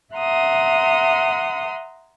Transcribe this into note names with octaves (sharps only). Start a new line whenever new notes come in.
E5 F#5 A#5 C6 D#6